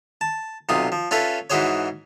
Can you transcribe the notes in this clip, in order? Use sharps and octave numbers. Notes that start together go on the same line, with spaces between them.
A5
B1 C3 F4 D#6
F3
C#4 F4 A4 B4 C#5 E5
G#2 E3 F#4 G#4 C5 C#5